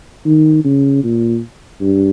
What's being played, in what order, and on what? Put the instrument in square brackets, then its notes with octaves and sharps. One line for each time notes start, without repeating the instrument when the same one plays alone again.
[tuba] D#3
C#3
A#2
G2